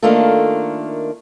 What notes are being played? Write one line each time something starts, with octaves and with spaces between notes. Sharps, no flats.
D#3 A3 A#3 D4 F4 A4